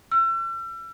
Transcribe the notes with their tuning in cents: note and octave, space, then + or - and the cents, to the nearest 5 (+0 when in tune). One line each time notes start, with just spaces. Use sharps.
E6 +40